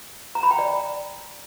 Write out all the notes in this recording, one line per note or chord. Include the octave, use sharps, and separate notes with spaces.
A#5
B5
G5
D5